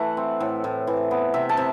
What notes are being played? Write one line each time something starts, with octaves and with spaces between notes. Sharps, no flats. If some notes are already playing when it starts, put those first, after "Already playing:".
Already playing: E3 A3 F#5
C4
A2
A2
E3
B3
C3 E5
A5
C3